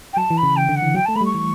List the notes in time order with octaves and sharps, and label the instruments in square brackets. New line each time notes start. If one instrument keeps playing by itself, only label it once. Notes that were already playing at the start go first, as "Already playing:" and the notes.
[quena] G5
[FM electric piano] F#3 [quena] A5
[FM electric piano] E3
[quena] B5
[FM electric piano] C#3
[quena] G5
[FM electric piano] D3
[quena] F#5
[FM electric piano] E3
[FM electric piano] F#3 [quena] G5
[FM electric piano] A3 [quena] A5
[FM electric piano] A3 [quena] B5
[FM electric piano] G3
[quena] C#6
[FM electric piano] E3